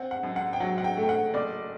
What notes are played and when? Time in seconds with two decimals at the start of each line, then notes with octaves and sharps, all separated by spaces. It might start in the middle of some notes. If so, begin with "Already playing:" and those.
Already playing: C4 F#5
0.11 F#5
0.23 F#2
0.36 F#5
0.53 G5
0.60 F#3 F#5
0.78 F#5
0.84 G5
0.97 A3
1.03 G5
1.09 F#5
1.34 F#1 D5